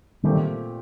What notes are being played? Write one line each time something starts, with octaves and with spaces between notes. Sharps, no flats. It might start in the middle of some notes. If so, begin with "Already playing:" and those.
A#2 D#3 G3 A3 C4 G4